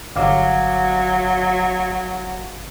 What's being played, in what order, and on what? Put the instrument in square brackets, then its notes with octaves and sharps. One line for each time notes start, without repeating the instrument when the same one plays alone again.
[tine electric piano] G1 F5 D6 [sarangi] F#3